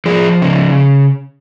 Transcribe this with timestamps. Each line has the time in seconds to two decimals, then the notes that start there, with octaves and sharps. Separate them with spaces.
0.06 F3 G#4
0.42 C#3